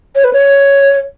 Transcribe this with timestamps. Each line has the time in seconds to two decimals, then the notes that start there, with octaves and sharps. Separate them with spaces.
0.15 C#5
0.24 B4
0.33 C#5